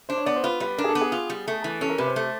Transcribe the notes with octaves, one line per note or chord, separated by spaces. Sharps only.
D4 C5
C#5
B3 D5
C5
F4 B4
G3 B4
D4 A#4
G#4
A4
B3
G#4
F4
G3
A3
E3
C#4 A4
A#4
C3 B4
C5
A3